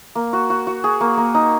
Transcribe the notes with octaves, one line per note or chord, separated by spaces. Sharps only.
A#3
F#4
F#4
F#4
G#4
A#3
A#3
D#4